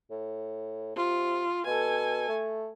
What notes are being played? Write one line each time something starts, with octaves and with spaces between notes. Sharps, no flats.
A2
C3 F4
B2 A4 G#5
A3